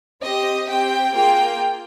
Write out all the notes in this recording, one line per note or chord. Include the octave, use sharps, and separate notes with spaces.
C4 G4 D#5
C4 G4 G5
A#3 F4 G#4 G5